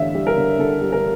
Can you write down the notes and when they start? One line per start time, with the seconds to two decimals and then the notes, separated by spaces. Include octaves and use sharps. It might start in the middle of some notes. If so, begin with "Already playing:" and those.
Already playing: A1 G2 D3 E5 F5
0.15 G3
0.27 A#4
0.37 D3
0.59 D3 A4
0.81 G3
0.92 A#4